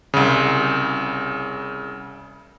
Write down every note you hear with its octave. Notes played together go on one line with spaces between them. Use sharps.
C2 C#3